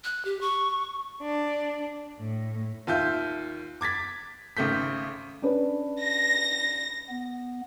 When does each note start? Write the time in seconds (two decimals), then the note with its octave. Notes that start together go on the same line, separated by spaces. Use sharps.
0.04 F#6
0.25 G4
0.41 C#6
1.22 D4
2.19 A2
2.87 D#2 F4 E5 G6
3.81 D6 G#6 A6 B6
4.57 G#1 C#3 A3 G6 B6
5.42 C#4 D4 B4
6.01 A#6
7.09 B3